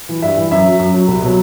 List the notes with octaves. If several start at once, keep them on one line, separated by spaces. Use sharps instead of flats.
E3
G2 E5
E3
F#2 E5
F#3
F#2
F#3
C2
B2 F#3